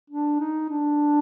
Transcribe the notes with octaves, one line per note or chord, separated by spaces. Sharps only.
D4
D#4
D4